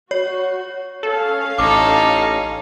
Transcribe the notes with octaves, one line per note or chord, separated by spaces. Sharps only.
F#4 C#5
C#4 A4 F5
A1 D#4 A4 D6